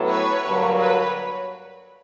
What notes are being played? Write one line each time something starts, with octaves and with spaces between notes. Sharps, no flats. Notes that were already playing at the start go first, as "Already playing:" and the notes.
Already playing: A2 F#3 B3 E4 A4
B4 C#5
G2 D3 F#3 A#3
B4 C#5